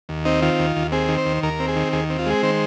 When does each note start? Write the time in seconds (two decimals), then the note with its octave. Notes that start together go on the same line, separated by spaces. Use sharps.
0.09 D#2
0.25 C4 D#4
0.42 D#3 F4
0.59 D#2
0.76 D#2
0.92 C4 G#4
1.09 D#3
1.18 C5
1.26 D#2
1.43 D#2 A#4
1.60 C4
1.68 G#4
1.76 D#3
1.93 D#2 G#4
2.10 C4
2.19 F4
2.26 G#3 G#4
2.43 D#3 C5